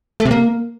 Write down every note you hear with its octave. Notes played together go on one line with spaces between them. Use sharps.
A3
C3
A#3